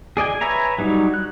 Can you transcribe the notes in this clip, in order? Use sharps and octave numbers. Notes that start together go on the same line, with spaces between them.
G#4 D5 D#5 G#5
B4 C#5 E5 G#5 A#5
F#3 G3 D#4 C#5
F#6